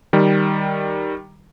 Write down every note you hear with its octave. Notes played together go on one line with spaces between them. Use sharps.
D#3 G3